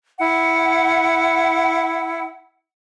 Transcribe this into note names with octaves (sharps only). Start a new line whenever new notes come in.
E4 F#5